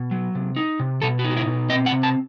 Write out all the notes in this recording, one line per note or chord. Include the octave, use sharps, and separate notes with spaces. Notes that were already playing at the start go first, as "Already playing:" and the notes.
Already playing: B2
F#3
C3
D#4
C3
B2 A4
F#4
D#4
F#4
E4
B2
C4 D#5
F#5
C3
A5